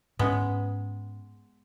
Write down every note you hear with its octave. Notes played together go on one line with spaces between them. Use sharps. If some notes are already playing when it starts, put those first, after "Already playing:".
G#2 G#3 B3 C#4